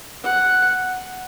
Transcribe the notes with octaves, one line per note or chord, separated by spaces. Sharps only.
F#5